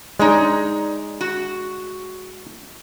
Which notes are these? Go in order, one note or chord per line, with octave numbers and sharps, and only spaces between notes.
G#3 D#4 C#5 D5
F#4